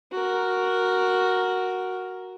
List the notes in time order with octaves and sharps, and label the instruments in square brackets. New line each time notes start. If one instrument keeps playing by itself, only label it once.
[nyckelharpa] F#4 A#4